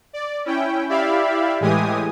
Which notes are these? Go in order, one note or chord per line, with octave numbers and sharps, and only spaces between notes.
D5
C#4 E4 G5
E4 G4 D5 E5 F5 B5
A2 E3 G#3 G4 G#5 D#6